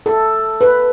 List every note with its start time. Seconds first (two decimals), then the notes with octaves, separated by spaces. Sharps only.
0.06 A4
0.61 B4